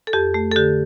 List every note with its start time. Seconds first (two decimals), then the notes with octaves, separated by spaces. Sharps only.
0.07 A4
0.13 F2 G4
0.34 A3
0.51 A4
0.56 D3 G4